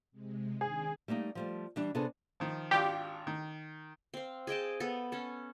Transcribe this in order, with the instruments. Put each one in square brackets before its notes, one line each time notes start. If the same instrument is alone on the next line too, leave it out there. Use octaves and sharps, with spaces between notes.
[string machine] C3 G#3
[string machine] D#3 C4 D4 [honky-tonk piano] G#4
[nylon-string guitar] G3 A3 A#3 D#4
F3 G3 A3
E3 G3 D4
C3 B3 D4 G#4 A4
[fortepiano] D#3 F3
[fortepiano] G#1 D4 F4 [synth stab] G4
[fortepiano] D#3
[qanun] C4 F5
G#4 D#5 G5 A5
B3 A4
C#4 A4